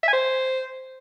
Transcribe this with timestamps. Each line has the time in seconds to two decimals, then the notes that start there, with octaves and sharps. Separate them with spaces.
0.03 E5
0.08 G#5
0.13 C5